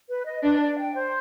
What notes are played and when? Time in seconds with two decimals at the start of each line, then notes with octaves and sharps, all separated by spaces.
0.09 B4
0.26 D#5
0.43 D4 B4
0.60 D5
0.77 G5
0.94 C5